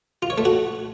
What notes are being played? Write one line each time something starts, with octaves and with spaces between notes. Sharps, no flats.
F4
C#5
A3
F#4